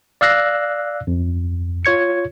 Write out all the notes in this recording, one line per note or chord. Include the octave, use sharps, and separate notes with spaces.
D5 F5 E6 F#6 A#6 C7
F2
F4 C#5 G#6 C#7